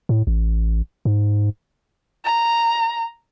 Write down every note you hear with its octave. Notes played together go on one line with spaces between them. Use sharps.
A2
A1
G#2
A#5